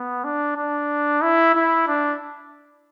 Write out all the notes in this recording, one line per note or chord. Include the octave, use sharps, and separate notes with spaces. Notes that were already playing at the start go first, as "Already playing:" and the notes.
Already playing: B3
D4
D4
E4
E4
D4